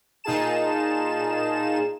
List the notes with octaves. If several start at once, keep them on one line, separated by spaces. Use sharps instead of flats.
A#2 D#4 F4 G#4 A5 E7